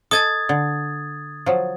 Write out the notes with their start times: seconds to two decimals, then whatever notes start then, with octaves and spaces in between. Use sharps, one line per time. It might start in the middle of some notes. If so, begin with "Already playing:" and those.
0.11 A4 D#5 G#5 D#6 G#6 A6
0.49 D3
1.46 F3 F#3